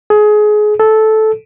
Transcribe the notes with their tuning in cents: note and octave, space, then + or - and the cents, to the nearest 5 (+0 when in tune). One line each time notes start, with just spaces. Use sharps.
G#4 +25
A4 -10